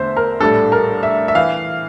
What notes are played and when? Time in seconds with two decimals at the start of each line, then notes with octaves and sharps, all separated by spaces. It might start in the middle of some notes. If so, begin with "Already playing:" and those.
Already playing: E2 D3 A3 C5 E5
0.17 A#4
0.40 A#1 A2 G3 D4 A4
0.72 A#4
1.03 E5
1.28 E5
1.35 E3 F5